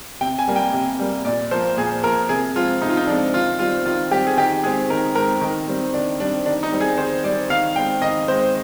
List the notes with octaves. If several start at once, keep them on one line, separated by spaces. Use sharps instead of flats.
C3 G5
G#5
G3 A#3
G5
C3
G3 A#3
A#2 D5
F3 A#3 C5
A#2 G#4
F3 A#3 A#4
C3 G#4
F3 G#3 C4 F4
C3 D#4
F4
D#4
F3 G#3 C4 D4
D#3 F4
G3 C4 F4
D#3 F4
G3 C4 G4
G#4
D#3 G4
G#3 C4 G#4
D#3 A#4
G#3 C4 A#4
D#3
G3 C4
D#3 D4
G3 C4 D4
D#3 D4
D#4
G3 C4
G#4
D#3 C5
G3 C4 D5
D#3 F5
G#3 C4 G5
D#3 D#5
G#3 C4 C5